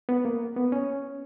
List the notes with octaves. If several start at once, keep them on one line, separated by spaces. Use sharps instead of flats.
B3
A#3
B3
C#4